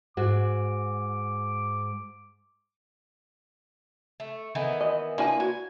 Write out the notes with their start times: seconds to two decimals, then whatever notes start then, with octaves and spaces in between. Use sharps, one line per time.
0.17 G#2 F#4 D6
4.20 A3
4.55 D#3 E3 B3
4.81 D#5
5.18 A#3 D4 E4 B4 G#5
5.40 F#4 G#5